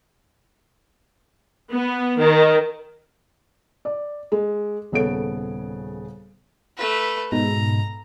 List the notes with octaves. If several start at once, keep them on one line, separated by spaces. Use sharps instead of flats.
B3
D#3
D5
G#3
D#1 C#3 B3 A4 C#5 D7
A3 B4
G#2 B2 G#3 A#5